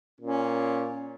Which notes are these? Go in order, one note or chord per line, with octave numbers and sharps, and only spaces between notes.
A#2 C#4